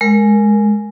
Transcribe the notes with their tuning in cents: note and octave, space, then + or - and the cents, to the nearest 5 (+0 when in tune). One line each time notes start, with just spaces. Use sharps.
G#3 +10 A#4 +0